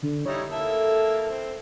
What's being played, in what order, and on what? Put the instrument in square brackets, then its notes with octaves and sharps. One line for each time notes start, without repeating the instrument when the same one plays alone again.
[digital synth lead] D3
[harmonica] G3 D#4 E4 [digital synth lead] C#5
[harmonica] A#3 E4 E5 [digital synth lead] A4
[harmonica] C4